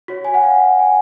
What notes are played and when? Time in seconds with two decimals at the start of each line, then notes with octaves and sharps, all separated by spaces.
0.08 F#4 C#5
0.25 G#5
0.34 F#5
0.44 F5
0.79 G#5